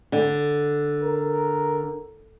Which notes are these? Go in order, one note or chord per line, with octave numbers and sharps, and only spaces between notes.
D3
A#4